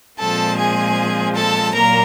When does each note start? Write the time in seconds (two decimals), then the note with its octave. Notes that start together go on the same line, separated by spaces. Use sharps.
0.18 A#2 F3 G#3 C4 A4 A5
0.57 G#4 G#5
1.35 A4 A5
1.74 A#2 F#3 A#3 A#4 A#5